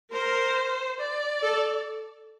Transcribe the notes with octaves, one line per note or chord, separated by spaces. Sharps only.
A#4 C5
D5
A4